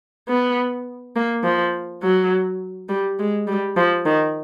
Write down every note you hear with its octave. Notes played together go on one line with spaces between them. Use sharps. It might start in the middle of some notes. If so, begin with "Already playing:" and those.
B3
A#3
F3
F#3
G3
G#3
G3
F3
D#3